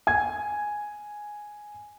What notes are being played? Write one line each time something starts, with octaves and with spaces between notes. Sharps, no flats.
G#5 G#6